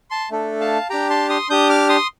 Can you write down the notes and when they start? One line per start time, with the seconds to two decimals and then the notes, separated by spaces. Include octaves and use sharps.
0.10 A5 C6
0.30 A3 D4 A4
0.61 F5 A5
0.90 D4 G4 G5 A#5
1.10 A5 C6
1.29 C6 D#6
1.49 D4 G4 D#6 G6
1.69 D6 F6
1.89 C6 D#6